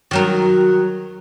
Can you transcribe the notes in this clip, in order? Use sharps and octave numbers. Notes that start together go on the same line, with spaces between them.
D#3 F#3 A#4